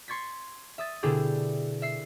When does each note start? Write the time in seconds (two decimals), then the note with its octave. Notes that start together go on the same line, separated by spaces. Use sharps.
0.08 C6 C#6 G#6 A6 B6
0.78 E5 D#6 A6
1.03 B2 D3 D4 E4 G4 G#4
1.82 E5 C7